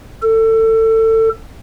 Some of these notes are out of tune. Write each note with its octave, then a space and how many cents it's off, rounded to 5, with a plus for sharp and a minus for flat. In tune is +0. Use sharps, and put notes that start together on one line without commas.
A4 +25